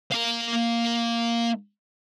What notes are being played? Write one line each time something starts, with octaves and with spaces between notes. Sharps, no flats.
A#3 F5